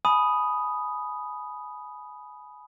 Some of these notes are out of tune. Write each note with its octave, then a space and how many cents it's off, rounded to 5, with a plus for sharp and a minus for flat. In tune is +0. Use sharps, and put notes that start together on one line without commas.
G#5 +25 B5 +0 D#6 +0